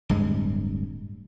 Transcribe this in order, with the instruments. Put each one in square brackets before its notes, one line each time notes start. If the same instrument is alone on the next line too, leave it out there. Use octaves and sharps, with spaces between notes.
[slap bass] D1 G2 G#3